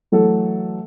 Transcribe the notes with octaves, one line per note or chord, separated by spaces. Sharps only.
E3 F#3 A3 A4